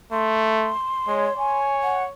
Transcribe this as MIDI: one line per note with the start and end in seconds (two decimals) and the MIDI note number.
0.12 0.73 57
0.12 1.58 84
1.08 1.28 56
1.08 1.33 73
1.38 2.13 73
1.38 1.94 80
1.83 2.04 78